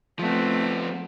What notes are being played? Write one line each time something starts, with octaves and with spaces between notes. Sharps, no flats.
F3 A3 B3 C4